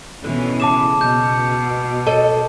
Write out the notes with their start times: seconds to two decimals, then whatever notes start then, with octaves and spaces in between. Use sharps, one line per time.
0.24 B2 D3 E3 C#4
0.60 C#3 A5 D6 E7
1.01 B2 G6
2.07 A4 C#5 D#5 A5